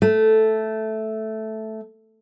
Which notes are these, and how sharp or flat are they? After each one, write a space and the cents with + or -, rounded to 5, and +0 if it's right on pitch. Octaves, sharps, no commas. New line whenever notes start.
A3 -5